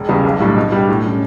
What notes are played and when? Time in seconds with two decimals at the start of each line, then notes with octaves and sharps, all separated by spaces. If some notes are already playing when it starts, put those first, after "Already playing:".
Already playing: E1
0.09 E2 C#3 G3 B3
0.25 B1
0.40 A2 G3 D4
0.56 B2
0.72 G3 D4 G4
0.89 A2
1.05 G3 C#4